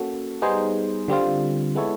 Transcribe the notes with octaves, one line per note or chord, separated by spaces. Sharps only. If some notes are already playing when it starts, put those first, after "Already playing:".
Already playing: A#3 C#4 F#4 A4
G3 B3 D#4 G#4 C5
D3 G3 C4 F4
G#3 B3 E4 A4 C#5